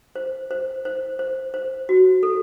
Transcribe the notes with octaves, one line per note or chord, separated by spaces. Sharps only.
C5
C5
C5
C5
C5
F#4
A4